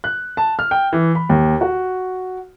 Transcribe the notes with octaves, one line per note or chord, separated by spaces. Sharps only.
F#6
A5
F6
G5
E3
B5
D#2
F#4